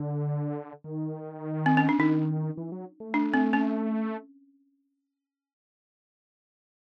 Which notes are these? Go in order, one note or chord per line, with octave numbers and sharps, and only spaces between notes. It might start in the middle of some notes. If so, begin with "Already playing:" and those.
Already playing: D3
D#3
C4
C#4
D4
D#3 D#4
E3
F#3
A3
D4
C4
C#4